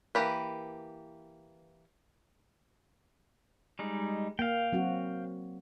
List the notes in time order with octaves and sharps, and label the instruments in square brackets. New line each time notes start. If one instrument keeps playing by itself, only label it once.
[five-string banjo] E3 A#3 G4 B4
[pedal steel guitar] G3 G#3 D#4
[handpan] A#3 [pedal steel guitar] F5 G5
[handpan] F#3 C4 F#4